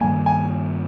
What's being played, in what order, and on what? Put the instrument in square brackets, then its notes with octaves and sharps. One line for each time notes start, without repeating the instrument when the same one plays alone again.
[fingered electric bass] G2 D#3 G3 A#3 [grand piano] G#5
[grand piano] G#5